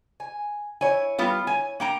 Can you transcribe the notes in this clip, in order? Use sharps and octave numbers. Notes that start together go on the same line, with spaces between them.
G#5
E4 C#5 G#5
G3 B3 F4
G#5
A#3 G5 A#5